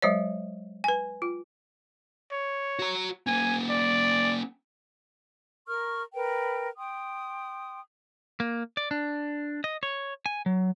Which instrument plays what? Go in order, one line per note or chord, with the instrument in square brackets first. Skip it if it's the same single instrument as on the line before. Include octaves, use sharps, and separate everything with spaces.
[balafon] F#3 G#3 C5 C#5
B4 G#5
F4
[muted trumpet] C#5
[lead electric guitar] F#4 A#5
[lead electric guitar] A#3 C#4 [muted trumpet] G#5
[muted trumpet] D5
[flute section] A#4 C#6 F6
A#4 B4 G5
G5 C6 D#6
[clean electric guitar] A#3
D5
D4
D#5
C#5
G#5
F#3